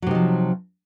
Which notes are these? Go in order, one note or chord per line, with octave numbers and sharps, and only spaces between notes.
C3 F3 F#3 D#4